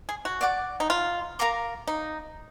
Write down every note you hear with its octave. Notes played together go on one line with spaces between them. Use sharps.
G#4
F#4
D5 F#5 D6
D#4
F4
A#4 F5 A#5 D6
D#4